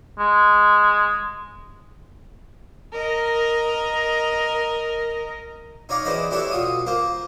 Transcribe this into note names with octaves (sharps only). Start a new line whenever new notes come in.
G#3
A#4 D#5
D#4 C#5 D5 F5 A#5
E2 E4 B4 C5 D5 D#5
D4 E4 G4 A4 C#5 E5
B2 F4 D#6
A#3 F4 C5